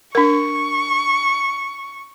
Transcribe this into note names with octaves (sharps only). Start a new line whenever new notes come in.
D4 A#4 C#6